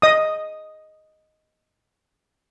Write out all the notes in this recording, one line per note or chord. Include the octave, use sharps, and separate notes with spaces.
D#5 D#6